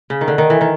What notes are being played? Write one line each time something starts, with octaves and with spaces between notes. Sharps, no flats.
C#3
D#3
D3
D#3
E3
D#3